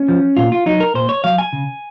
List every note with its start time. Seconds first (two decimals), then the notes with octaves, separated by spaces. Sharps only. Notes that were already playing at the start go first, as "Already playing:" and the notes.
Already playing: C#4
0.09 F3
0.37 A#2 F4
0.52 F4
0.66 F#3 D#4
0.80 A#4
0.94 A#2 C5
1.09 C#5
1.24 F#3 F5
1.38 G#5
1.53 C#3